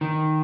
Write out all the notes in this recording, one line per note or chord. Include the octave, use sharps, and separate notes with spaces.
D#3